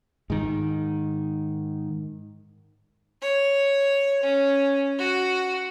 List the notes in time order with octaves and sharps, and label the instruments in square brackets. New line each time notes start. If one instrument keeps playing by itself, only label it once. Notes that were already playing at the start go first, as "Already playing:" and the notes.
[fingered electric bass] G#2 D#3
[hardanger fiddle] C#5
C#4
F#4